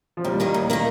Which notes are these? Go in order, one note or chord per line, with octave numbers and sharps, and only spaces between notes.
F3
D#2 G3
D#3 A#3 D#4
D#2
D#3 A#3 D#4